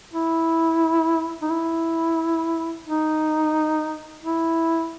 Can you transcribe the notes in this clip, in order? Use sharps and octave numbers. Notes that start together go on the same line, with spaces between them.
E4
D#4
E4
D#4
E4